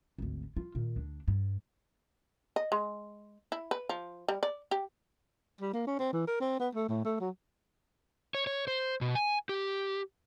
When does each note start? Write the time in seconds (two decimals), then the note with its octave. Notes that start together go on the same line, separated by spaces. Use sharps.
0.18 G#1 D2
0.57 F4
0.75 A#2 D#3
0.96 D2 D4
1.28 G2
2.56 D#5
2.72 G#3
3.52 E4
3.71 B4
3.89 F3
4.28 G3
4.43 D5
4.71 G4
5.61 G3
5.73 A#3
5.87 C#4
5.99 C4
6.13 E3
6.27 A#4
6.41 C4
6.60 B3
6.75 A3
6.89 A2
7.05 A3
7.20 F#3
8.35 C#5
8.47 C#5
8.68 C5
9.01 B2
9.15 G#5
9.49 G4